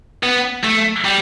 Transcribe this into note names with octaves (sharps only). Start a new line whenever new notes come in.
B3
A3
G3